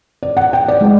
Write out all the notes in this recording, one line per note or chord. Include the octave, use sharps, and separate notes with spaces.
D5
F#5
G5
D5
G#3